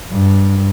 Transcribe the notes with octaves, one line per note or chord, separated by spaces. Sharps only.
G2